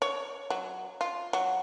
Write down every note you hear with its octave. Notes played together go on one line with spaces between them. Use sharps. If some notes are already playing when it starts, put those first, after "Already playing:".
C#5
F#3
F4
F#3